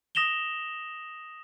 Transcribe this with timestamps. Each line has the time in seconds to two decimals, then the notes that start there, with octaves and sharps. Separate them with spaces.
0.15 D#6 A#6 E7 F7 G7